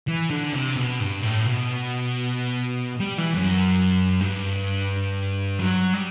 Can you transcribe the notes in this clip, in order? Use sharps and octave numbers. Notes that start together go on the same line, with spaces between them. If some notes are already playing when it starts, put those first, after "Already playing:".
E3
D3
C3
B2
G2
A2
B2
G3
E3
F#2
G2
F#3
G3